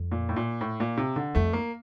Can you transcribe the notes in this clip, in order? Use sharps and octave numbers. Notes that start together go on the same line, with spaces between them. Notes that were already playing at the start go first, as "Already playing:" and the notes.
Already playing: F2
A#2
A2
A#2
A2
A#2
C3
D3
F2 A3
A#3